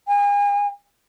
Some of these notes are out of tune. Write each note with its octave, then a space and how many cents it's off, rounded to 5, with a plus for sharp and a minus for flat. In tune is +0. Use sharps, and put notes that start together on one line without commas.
G#5 -40